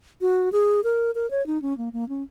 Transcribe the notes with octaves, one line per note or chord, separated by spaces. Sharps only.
F#4
G#4
A#4
A#4
C#5
D#4
C#4
A#3
A#3
C#4